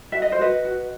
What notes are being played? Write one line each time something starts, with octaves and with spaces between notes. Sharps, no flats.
F#4 E5
D#5
C5
F#4 B4 D#5
F#4